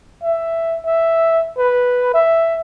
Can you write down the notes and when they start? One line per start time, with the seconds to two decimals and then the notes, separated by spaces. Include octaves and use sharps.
0.23 E5
0.86 E5
1.57 B4
2.14 E5